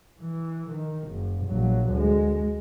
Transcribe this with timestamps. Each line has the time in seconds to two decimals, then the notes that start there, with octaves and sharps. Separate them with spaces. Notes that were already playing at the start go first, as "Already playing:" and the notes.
0.20 E3
0.70 D#3
1.09 F#1
1.47 A#1 F#3
1.89 D2 G#3